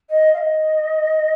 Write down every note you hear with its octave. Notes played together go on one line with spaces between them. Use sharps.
D#5
F5
D#5